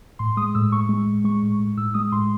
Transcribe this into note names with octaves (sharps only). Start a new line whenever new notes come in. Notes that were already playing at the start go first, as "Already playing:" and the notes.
A2 C6
G#3 D#6
A2 E6
A2 C#6
G#3
A2
G#3 C#6
A2
A2
A2 E6
G#3 D#6
A2 C6